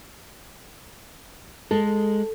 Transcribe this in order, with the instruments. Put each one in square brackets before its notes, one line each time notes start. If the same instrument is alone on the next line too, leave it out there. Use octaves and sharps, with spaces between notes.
[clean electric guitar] G#3 [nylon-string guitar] A4